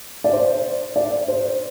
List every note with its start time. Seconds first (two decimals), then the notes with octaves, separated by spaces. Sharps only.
0.24 D5
0.33 C5
0.96 D5
1.28 C5